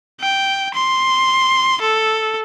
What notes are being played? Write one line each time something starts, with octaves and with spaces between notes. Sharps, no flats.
G5
C6
A4